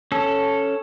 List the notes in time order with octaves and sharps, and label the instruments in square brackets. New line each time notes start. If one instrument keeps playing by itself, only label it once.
[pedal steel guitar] C#4 A4